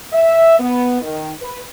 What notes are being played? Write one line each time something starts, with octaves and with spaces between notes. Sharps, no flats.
E5
B3
D#3
B4